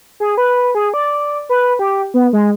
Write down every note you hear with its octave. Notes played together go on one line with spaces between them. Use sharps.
G#4
B4
G#4
D5
B4
G4
B3
G#3